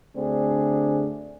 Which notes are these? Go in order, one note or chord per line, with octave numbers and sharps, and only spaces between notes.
D2 D3 A3 C4 D4 G#4